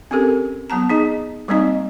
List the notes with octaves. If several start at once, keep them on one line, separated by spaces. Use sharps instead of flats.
C4 C#4 G4 A4 A#4
F#3 B3 A5 A#5
D#4 G#4 D#5
G3 G#3 A#3 C4 D#4 D#5